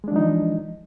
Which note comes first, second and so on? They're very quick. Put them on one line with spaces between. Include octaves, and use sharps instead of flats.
G#3 D4 F3 D#4 E3